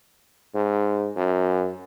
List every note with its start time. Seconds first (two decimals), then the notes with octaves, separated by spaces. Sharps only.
0.55 G#2
1.16 F#2